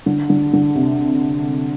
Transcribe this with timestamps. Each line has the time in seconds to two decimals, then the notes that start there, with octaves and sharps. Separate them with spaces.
0.06 D3
0.30 D3
0.53 D3
0.75 C3